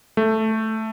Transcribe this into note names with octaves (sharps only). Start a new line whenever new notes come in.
A3